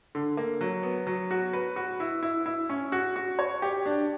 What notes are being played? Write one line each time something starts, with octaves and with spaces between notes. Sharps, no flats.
D3
A#3
F#3
B3
F#3
F#4
B4
F#4
E4
E4
E4
C#4
F#4
F#4
C#5
G4
D4